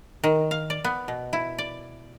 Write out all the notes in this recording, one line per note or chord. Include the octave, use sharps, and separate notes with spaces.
D#3
F5
D5
B3
B2
E4
D5